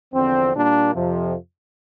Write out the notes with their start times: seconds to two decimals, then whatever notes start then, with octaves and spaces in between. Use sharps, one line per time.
0.14 E2 D3 F3 C4
0.54 A#2 G3 A#3 D4
0.94 F2 C3 F3